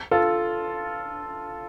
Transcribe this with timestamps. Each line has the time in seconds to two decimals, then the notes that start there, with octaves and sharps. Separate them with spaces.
0.11 F4 A4